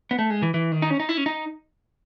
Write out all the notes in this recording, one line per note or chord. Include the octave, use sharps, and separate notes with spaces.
B3
A3
G#3
E3
E3
D#3
D#4
C#4
D#4
E4
C#4
D#4